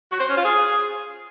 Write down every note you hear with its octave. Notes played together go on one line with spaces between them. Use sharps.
F#4
C5
C#4
F4
G#4